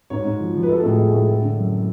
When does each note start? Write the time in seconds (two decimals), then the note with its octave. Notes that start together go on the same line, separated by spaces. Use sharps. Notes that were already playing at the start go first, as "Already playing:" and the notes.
0.10 G#2 C#5
0.24 G#2
0.40 F3
0.55 F3
0.63 B4
0.69 G#3 A4
0.80 A2 A4
0.88 G#4
0.98 G#3
1.08 G#4
1.12 A2
1.28 G#3 A4
1.42 D3
1.57 F#2